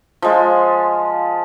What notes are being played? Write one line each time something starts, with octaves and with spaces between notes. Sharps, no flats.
F3 G#3 F4